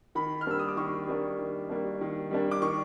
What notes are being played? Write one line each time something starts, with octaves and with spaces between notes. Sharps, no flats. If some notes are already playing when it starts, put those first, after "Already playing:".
D#3 B5
F6
G3 A#3 D4 E6
D#6
D6
D#3 C#6
G3 A#3 D4
D#3
G3 A#3 D4
D#3
G3 A#3 D4
D6
D#3 C#6